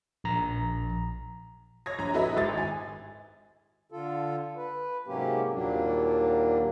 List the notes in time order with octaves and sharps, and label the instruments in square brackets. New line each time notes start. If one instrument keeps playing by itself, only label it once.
[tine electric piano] A#1 A#5
[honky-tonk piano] C#5 G#6 A#6
A#1 A#5
E4 F#4 A4 B4 D#5 E5
G#1 A6
G#5
[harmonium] D3 F4 A4
B4
G#2 C3 F#3 A#3 C#4 G4
D#2 A#2 F#3 G3 A#3 D4